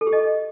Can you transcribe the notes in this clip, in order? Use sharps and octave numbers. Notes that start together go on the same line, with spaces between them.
A4
G4
D#5